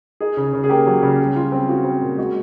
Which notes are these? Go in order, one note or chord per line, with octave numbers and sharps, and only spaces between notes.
D#4 G#4
C#3
C#3
G#4
A#3 G4
F#3
C#3
G3
F4
C4
F4 F#4
C4
A#2
G#3 F#4